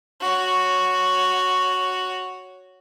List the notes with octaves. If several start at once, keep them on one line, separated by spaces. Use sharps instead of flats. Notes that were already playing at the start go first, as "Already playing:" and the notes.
F#4 C#5